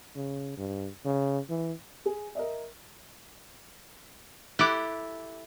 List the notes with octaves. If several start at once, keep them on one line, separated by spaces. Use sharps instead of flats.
C#3
G2
C#3
E3
G#4
A#4 D#5 E5
E4 G4 A4 D6 F#6